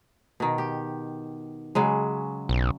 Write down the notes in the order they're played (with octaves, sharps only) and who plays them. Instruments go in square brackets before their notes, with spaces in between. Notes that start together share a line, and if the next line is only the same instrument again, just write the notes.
[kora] B2 D#3
G4
C#3 F#3 G#3
[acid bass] B1